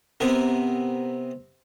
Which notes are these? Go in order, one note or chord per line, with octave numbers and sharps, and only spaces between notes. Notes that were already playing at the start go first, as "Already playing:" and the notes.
C3 B3 A#4